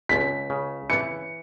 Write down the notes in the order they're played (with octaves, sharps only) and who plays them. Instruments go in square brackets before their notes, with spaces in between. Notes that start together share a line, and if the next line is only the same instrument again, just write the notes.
[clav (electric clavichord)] C#2 [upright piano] B6
[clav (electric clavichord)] C#3
[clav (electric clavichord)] E3 [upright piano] C#7